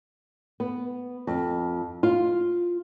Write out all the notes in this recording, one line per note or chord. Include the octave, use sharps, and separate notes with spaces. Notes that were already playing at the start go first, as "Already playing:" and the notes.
B3
F2
F4